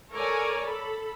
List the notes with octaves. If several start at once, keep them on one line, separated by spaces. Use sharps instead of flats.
A4 A#4 C#5 D5 G#5
A4 B5